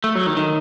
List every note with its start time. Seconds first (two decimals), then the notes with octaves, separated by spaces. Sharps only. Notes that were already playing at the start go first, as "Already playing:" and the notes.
0.04 A3
0.15 F#3
0.27 D#3
0.37 D#3